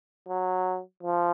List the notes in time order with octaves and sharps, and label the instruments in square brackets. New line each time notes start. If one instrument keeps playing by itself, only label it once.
[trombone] F#3
F3